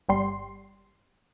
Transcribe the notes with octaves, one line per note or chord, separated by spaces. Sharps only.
G1 G3 C6